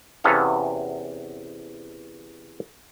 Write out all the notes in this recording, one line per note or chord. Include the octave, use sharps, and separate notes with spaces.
E2 C3 B3 C#4 A4 F5